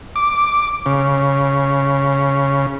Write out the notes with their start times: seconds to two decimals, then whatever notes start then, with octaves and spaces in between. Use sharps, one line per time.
0.16 D6
0.86 C#3